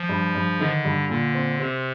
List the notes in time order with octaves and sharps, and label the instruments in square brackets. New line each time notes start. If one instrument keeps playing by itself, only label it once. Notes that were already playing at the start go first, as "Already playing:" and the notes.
Already playing: [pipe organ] F3
[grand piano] G2
G2
[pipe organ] D3 [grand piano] D#3
[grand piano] G2
[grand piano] A#2 [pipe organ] D3
[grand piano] C4
[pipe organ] C3 [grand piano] C4